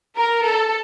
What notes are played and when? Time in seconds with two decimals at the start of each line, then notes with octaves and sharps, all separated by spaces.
0.16 A#4
0.44 A4